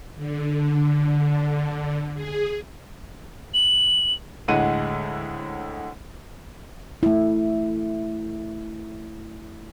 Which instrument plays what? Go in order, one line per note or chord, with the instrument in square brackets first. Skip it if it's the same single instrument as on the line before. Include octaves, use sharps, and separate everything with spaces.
[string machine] D3
G#4
[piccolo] F#7
[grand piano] D2 A2 G#3 F#5 D#7
[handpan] A3 E4